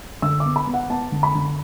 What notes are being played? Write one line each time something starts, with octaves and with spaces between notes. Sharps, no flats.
D3 E6
D6
B3
B5
B3
F#5
B3 A5
D3
B5
D3